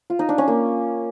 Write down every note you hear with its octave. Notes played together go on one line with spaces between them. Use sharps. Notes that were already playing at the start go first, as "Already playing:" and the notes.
F4
D#4
D4
C#4
A#3